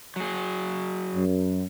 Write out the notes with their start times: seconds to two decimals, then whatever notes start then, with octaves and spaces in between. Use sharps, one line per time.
0.16 F#3 G#4
1.14 F#2